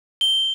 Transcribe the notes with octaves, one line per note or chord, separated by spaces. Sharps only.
G7